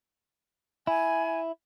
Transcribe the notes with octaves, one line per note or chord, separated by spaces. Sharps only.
E4 G#5